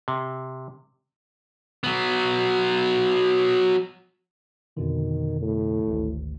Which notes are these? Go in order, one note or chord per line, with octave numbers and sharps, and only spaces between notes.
C3
F#3 B3
F2 B2 D3 D#3
A2
G#1 D2